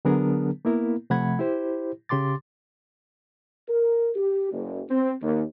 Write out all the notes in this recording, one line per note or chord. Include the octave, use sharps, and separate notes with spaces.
D3 F#3 B3 D4 G#4 A#4
A#3 B3 E4 A#4
C3 F3 A3 F#5 B5 G#6
E4 G4 C5
C#3 G4 C6 D6 A6
A#4
G4
F#1
C4
D#2